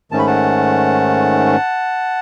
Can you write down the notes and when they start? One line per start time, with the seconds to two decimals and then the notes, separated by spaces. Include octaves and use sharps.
0.11 G#2 D#3 A3 C#4 A5
0.19 B5
0.27 F#5 A5